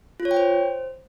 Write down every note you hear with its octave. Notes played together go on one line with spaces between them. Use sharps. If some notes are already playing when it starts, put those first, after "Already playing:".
F4
C#5
G5
C5